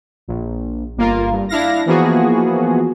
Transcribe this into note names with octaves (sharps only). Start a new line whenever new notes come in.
A#1
G1 A#3 F4 A#4
G2
D4 E4 F5 A#6
E3 F3 A#3 B3 F#4 G#4